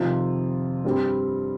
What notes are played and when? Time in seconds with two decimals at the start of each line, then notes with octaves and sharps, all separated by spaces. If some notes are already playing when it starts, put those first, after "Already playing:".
Already playing: F2 C3 D#3 C4 F4
0.84 G2 G3 C4